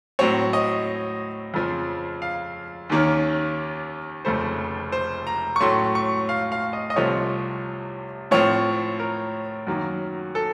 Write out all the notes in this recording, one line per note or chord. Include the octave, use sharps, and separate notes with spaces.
A2 F#3 C4 C#5
D#5
F2 C#3 F3 C4
F5
D#2 D#3 A#3 C#4
F1 F2 C#3 A3 C5
C5
A#5
C#6
A2 F#3 A3 C#4 C6
C#6
F5
F5
D#5
D#5
C2 C3 F3 A3 C4 C#5
A2 F3 C4 C#5
A#4
F#2 D#3 F#3 A#3
A4